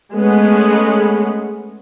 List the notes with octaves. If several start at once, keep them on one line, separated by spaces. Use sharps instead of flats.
G#3 A3 B3 C#4